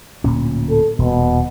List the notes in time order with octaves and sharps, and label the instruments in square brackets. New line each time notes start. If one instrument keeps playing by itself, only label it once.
[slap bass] D1 A#2 C#4
[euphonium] A4
[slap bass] D#1 [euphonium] B2